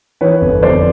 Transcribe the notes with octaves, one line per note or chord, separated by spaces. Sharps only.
E3 B4 C#5
G1
F2 C5 D5